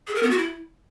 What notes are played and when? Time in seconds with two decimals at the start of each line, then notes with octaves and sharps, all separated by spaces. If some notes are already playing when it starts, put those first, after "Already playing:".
0.07 G#4
0.15 A#4
0.23 B3
0.30 F#4
0.38 E4